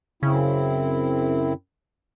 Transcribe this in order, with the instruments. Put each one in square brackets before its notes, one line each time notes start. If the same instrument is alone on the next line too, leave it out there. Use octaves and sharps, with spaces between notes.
[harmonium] F#2 C4 E4 [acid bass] C#3